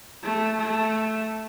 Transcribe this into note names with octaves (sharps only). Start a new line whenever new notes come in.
A3
A3